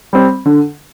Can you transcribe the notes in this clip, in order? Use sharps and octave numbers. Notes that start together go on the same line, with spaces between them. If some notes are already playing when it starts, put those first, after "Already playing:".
G3 C4
D3